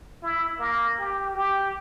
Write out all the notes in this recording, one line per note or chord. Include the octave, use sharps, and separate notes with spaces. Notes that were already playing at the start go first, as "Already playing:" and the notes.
E4
A#3
G4
G4